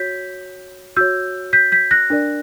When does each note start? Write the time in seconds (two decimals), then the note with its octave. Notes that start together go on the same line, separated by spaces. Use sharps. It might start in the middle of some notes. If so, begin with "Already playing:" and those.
Already playing: F#4 C#5 G6 B6
0.97 F#4 C#5 E6 G6
1.53 G6 B6
1.72 G6 B6
1.91 F#6 A#6
2.10 D4 A#4 D5